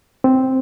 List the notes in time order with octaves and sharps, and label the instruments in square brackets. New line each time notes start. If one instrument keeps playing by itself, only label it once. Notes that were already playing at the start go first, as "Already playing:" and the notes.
[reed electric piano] C4